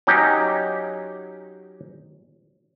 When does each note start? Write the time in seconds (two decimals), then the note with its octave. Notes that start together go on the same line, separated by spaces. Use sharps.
0.07 F#3 C#4 D#4 G4